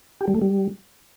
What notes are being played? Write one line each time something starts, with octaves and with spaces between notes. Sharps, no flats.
G4
G3
A3
G3